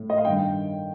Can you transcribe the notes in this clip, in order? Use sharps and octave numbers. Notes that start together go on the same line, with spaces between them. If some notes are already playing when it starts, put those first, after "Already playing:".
Already playing: A2
D#5
F5
G2 D#3 G5